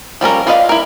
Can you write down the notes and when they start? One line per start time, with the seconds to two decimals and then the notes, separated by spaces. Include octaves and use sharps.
0.21 F3 G3 C#4 A#4
0.47 F4 B4 D5 D#5 F5
0.69 E4 A#4